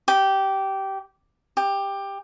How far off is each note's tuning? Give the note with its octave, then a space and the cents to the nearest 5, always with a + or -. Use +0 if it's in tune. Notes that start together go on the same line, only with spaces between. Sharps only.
G4 -15
G4 +15